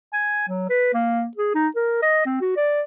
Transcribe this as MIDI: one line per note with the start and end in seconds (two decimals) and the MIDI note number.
0.13 0.43 80
0.48 0.69 54
0.69 0.91 71
0.94 1.27 58
1.37 1.50 68
1.54 1.68 63
1.76 2.01 70
2.02 2.22 75
2.25 2.38 60
2.40 2.54 66
2.56 2.81 74